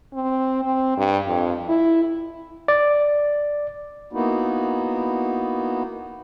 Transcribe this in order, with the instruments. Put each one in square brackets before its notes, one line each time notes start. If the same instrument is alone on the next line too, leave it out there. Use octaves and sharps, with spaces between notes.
[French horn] C4
C4
G2
F2
E4
[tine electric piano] D5
[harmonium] A#3 B3 D#4 E4 F#4